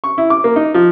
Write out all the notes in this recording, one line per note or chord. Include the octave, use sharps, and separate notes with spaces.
C#6
E4
D6
A#3
D#4
F3